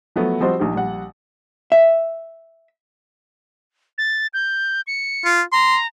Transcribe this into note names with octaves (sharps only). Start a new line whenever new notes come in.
F3 F#3 A3 B3
F3 G3 C4 F#4 C5 D#5
A#1 D#4 G4
A#1 G3 F#5
E5
A6
G6
C#7
F4
A#5 C6